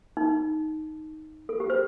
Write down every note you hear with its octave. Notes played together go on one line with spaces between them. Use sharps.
D#4
A4
G4
C5